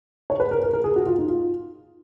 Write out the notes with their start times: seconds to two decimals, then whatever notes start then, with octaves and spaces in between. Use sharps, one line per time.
0.30 C#5
0.40 B4
0.51 A#4
0.63 A#4
0.73 A#4
0.84 G#4
0.96 F#4
1.06 F4
1.18 D#4
1.28 F4